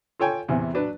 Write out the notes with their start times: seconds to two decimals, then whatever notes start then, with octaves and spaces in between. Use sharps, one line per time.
0.20 F4 A4 C#5 G5 G#5
0.48 E2 C3 E3
0.74 F#3 D4 B4